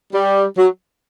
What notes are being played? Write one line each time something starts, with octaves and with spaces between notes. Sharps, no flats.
G3
F#3